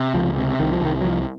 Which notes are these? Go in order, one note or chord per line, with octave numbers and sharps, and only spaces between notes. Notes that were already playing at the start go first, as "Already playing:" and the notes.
Already playing: C3
C#2 F3
C3
C2 D#3
F3
C2 D#3
F#3
C2 F3